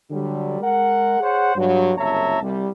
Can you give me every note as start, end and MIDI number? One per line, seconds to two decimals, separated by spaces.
0.10 0.60 50
0.10 0.60 54
0.10 0.60 55
0.61 1.19 56
0.61 1.19 70
0.61 1.19 78
1.21 1.54 68
1.21 1.54 72
1.21 1.54 73
1.21 1.54 78
1.56 1.91 43
1.56 1.91 54
1.97 2.41 30
1.97 2.41 36
1.97 2.41 73
1.97 2.41 76
1.97 2.41 81
1.97 2.41 82
2.41 2.68 36
2.41 2.68 55